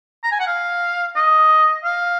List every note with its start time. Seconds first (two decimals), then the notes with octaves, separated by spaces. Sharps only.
0.23 A#5
0.32 G#5
0.40 F#5
0.47 F5
1.16 D#5
1.84 F5